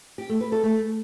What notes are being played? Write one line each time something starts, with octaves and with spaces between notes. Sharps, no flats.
G4
A3
B4
A4
A3